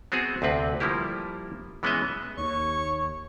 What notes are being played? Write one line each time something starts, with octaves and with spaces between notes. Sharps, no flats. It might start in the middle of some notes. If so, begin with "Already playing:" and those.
B3 C4 F#4 G#4
D2 C3 C4 B4
F3 G3 A#3 E4 G4
E3 G#3 B3 C#4 D#5 E5
D#2 C#5 C#6